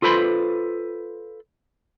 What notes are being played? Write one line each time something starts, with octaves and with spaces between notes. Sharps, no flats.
F4 A4 B4 C5 B5 C6